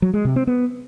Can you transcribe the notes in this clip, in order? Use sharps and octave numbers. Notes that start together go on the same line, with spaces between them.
F#3
G#3
C3
C4
B3